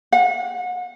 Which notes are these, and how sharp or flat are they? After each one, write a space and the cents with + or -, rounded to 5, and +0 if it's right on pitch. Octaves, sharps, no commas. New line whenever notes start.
F#5 -35